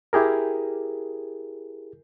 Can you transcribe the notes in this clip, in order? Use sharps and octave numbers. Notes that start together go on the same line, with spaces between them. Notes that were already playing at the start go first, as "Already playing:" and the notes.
E4 G4 G#4 A#4